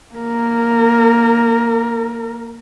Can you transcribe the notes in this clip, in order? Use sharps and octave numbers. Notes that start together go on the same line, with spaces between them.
A#3 A#4